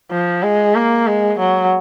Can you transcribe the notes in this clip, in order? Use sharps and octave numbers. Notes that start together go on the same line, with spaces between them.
F3
G#3
A#3
G#3
F#3